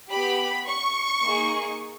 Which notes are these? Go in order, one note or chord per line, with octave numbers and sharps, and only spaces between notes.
B3 G4 B5
C#6
A#3 D#4 G#4